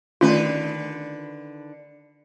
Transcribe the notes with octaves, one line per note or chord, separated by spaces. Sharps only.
D3 D#3 A3 C#4 F4 B4